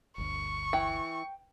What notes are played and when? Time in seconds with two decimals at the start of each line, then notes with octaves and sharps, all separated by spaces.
0.18 G1 D2 C#6
0.73 E3 G5